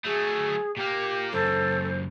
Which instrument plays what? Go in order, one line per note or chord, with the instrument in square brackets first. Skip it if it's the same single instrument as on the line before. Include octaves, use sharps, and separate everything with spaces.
[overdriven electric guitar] F#3 A3 [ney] G#4
[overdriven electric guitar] A#2 A#3 [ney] G4
[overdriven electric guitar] C#2 F#2 [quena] A4 [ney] C5